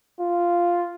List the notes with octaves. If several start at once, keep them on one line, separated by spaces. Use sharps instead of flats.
F4